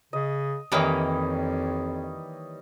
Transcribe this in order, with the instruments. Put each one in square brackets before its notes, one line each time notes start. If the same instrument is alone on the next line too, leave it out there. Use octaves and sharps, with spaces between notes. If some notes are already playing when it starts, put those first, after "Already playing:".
[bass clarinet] C#3 [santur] D#5
[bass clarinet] F2 [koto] D#3 E3 A#3 [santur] G3 C#5 D#5